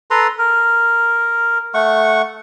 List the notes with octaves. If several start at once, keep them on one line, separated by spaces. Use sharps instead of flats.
A4 B4 A#5 C6
A#4
A3 F#5 C#6